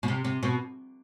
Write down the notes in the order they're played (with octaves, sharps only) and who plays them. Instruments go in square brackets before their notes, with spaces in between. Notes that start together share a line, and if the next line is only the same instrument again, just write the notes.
[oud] B2
C3
C3
B2